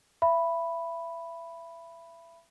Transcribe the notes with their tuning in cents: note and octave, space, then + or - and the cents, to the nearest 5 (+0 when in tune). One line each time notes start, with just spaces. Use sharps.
E5 +30 B5 +0